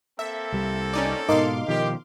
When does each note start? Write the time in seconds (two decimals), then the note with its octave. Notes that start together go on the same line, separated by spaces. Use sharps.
0.19 A#3 C4 A4 E5
0.52 C2 G3
0.93 C#4 D#4 D5
1.29 G#2 B2 D#4 A#4 D#5 F5 C6 D6
1.68 B2 D#3 F3 G4